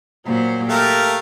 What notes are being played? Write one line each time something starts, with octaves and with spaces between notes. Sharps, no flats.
A#2 F#3 C5
A3 G4 A#4 F5